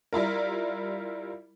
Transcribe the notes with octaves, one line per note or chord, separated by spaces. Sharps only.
G3 E4 F4 A#4